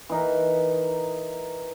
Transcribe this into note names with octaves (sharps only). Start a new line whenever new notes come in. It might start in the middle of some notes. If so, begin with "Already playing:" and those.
E3 D#4 A#4